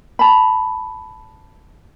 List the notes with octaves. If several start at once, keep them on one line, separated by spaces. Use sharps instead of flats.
A5 B5